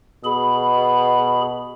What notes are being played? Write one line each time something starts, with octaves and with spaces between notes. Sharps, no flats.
B2 G#4 B5